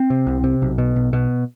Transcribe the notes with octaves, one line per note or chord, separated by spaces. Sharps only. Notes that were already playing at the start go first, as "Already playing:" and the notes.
Already playing: C4
C3
C2
C3
B1
B2
B1
B2